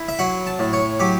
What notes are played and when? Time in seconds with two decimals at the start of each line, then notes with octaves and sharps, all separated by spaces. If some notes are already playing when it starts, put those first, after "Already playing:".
Already playing: E4
0.08 E5
0.19 F#3 F#5
0.47 A5
0.59 A2
0.73 C#5
1.00 F#3 G4